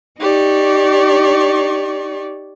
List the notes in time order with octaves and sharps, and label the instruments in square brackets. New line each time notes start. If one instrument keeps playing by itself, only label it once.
[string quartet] D#4 G4 D5 C#6